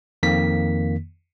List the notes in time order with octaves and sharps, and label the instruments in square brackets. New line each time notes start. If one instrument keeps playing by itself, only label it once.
[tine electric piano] F2 D#3 A#3 B6